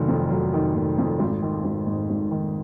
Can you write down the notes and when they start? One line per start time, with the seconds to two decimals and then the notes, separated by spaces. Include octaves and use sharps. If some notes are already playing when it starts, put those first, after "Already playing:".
Already playing: F1 D#3 F#3
0.08 F2
0.30 F#3
0.54 D#3
0.75 F1
0.98 F2
1.19 G#1
1.42 D#3
1.65 G#1
1.87 G#2
2.10 G#1
2.31 D#3